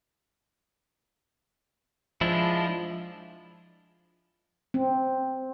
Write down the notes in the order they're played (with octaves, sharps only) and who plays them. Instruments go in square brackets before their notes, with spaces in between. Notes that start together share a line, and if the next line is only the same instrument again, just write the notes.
[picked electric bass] F3 [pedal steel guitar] G#3 D4 E4
[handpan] C4